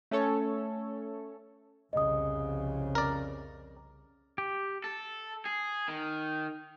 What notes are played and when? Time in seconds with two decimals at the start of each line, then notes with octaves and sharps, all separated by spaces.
0.11 A3 C#4 A4 C#5
1.93 C2 F2 C#3 D#5 D#6
2.95 A#4 D5
4.38 G4
4.84 A4
5.45 G#4
5.88 D#3